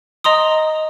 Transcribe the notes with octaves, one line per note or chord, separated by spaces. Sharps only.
D#5 A#5 C6 D#6